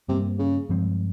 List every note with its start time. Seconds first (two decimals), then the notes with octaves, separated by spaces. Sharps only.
0.08 G2 C3 G3 A#3
0.39 C#3
0.69 G2 F3 G#3 C4